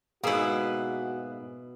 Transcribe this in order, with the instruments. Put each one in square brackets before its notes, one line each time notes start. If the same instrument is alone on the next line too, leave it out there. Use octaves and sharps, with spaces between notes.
[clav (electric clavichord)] G#2 A#3 [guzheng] B2 E4 [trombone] F#4 [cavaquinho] G#4 B4